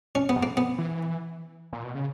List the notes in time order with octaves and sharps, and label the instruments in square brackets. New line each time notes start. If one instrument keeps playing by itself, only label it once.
[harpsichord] C#4
B3
[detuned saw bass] F#2
[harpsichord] A#3
B3
[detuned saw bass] E3
A#2
B2
C#3